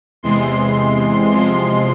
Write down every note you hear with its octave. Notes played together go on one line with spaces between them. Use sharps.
E2 C3 E3 G#3 C6
E2 C3 F3 G#3 C6